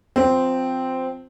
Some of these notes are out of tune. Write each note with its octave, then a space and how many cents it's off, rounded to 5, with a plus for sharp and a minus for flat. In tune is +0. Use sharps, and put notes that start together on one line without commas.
F3 +15 C4 -5